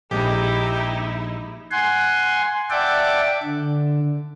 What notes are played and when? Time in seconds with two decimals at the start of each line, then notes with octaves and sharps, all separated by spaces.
0.11 A#1 G#3 D#4 E4 G4
1.71 F#5 G#5 C6
2.70 D5 E5 F#5 G5 A5 D6
3.43 D3